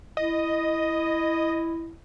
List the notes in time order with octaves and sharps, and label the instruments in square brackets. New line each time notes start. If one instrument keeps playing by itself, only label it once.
[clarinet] E4 [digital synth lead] D#5